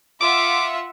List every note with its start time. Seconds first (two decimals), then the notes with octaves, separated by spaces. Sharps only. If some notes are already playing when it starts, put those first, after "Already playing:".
0.21 F4 E5 F#5 D6